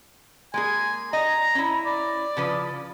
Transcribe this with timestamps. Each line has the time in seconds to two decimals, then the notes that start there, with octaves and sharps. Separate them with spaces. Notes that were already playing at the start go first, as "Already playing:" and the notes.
0.54 G#3 A#3 G#4 G#5
1.13 D#5 A#5
1.55 C#4 E4
1.86 D5
2.37 C#3 F3 B4